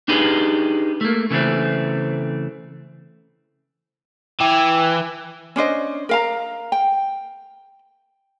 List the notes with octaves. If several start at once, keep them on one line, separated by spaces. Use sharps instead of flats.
D4 D#4 G4 G#4 B4
A3 A#3
C#3 E3 A3 C4
E3 G5 D6 G#6
C#4 D4 C5 D#5
A#4 F5 A#5
G5